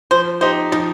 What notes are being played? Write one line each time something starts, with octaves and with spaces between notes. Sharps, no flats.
F3 C5
D#4 G4 C5
F3 D#4